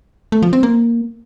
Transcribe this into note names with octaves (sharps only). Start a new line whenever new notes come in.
A3
F3
C4
A#3